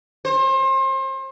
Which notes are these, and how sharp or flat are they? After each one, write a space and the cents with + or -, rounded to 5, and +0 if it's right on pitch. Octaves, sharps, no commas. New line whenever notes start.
C5 +35